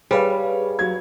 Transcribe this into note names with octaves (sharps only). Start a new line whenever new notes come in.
G3 G#4 B4 C#5 F5
F#3 G#6